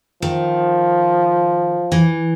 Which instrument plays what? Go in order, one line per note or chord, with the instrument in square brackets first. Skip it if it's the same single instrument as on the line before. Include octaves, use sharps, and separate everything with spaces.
[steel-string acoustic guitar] D#3 [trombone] F3
[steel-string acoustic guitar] E3